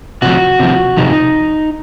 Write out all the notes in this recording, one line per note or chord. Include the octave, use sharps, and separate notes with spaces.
C3 F3 F#4
C3 F3
C3 F3 D#4